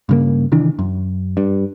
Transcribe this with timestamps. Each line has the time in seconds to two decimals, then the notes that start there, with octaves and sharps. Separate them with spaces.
0.09 G2 C#3 A#3
0.52 C3 D#3 E3 D4
0.79 F#2
1.37 G2